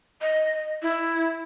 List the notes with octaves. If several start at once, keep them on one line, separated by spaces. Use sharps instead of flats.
D#5
E4